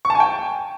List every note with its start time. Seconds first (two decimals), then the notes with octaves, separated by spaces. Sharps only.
0.05 C#6
0.10 A5
0.15 G#5
0.20 G5